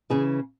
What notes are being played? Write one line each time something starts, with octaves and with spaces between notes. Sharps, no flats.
C#3 E3 G#4